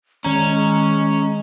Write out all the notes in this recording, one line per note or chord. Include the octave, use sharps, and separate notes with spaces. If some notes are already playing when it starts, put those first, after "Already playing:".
D#3 G#3 C#4 A#5